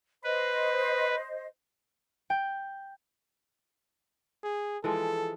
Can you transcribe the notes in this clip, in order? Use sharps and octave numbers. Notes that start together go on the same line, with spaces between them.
B4 C5 D#5
G5
G#4
E3 F3 G#3 A4